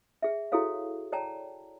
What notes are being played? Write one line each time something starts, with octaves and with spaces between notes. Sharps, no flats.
G#4 E5
E4 F#4 G#4 A4 C#5 F5
C#5 D5 G5 A5 A#5